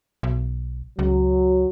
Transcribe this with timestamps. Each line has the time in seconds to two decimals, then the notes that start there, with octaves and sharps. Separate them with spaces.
0.23 B1
0.99 C#2 F#3